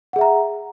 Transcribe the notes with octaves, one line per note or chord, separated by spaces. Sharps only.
G#4 E5 F#5 A#5